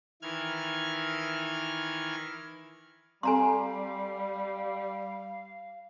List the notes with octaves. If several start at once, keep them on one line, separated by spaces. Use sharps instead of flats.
D#3 E3 F6 G#6
G3 C4 A4 F5 G#5 A#5 C6